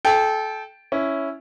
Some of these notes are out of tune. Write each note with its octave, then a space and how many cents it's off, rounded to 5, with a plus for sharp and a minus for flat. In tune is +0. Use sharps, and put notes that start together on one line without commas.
A4 -25 G5 +0
C#4 +0 E4 +0